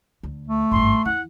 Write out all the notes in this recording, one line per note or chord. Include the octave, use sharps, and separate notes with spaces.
D2
A3
G#1 G2 C6
E2 E3 F#5